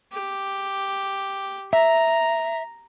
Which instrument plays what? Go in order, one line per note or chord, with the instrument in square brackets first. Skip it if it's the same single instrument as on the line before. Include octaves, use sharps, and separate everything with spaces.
[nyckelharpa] G4
[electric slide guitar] E5 [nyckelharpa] A#5